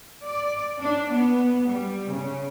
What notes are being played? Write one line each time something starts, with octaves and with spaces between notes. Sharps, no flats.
D5
D4
B3
G3
C#3